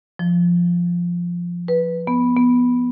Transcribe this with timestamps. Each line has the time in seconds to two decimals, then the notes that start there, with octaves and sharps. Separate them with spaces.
0.19 F3
1.68 B4
2.07 B3
2.37 B3